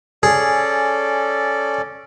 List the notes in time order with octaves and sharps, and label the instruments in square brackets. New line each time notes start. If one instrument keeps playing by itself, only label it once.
[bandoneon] C#4 A4 D5 [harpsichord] G#4